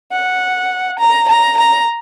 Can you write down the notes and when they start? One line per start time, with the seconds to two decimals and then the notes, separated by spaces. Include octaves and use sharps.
0.13 F#5
0.99 A#5
1.28 A#5
1.57 A#5